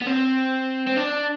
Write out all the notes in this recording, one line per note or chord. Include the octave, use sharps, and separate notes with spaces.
B3
C4
C4
D4